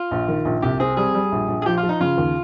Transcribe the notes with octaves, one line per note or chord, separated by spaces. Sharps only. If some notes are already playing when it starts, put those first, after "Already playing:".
Already playing: F4
A#1
D#3
A#1
C2 G4
C4 G#4
G3 G#4
G3
A#1
A#1
G#4
F3 G4
F4
F3
D#4
C#3 F4
D#2